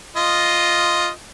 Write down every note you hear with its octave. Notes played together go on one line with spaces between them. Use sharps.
F4 D#5